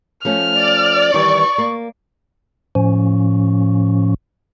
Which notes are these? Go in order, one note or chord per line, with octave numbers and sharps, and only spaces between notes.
F3 A3 C#4 F6
D5
D#3 E3 G3 C#6
A#3
A2 F3 C#4